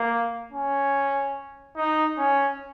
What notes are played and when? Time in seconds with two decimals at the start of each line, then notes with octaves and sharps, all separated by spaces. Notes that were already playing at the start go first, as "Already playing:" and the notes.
Already playing: A#3
0.52 C#4
1.76 D#4
2.18 C#4